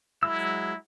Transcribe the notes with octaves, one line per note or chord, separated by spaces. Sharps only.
F#3 G#3 E4 E6